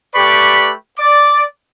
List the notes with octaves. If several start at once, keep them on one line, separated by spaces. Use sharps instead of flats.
A3 G4 B4 D5 B5 C#6
D5 D6